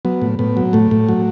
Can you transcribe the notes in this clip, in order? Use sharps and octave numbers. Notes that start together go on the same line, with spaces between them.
F#3 B3
A2
A2 B3
F#3
A2 A3
A2
F#3